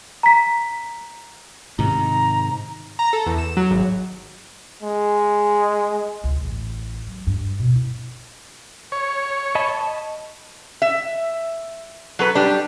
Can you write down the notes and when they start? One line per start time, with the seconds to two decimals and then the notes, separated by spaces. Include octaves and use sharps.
0.23 A#5 B6
1.79 G#2 C3 D#3 A#5
2.99 A#5
3.13 A4
3.26 E2
3.38 E7
3.57 F#3
3.71 G#1
4.83 G#3
6.24 C#2
6.45 A1
7.07 F#3
7.27 G2
7.59 B2
7.75 E4
8.92 C#5
9.55 D#5 A5 B5
10.82 E5
12.19 F#3 A4 B4
12.35 G3 D4